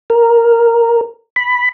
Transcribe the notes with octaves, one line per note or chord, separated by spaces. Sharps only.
A#4
B5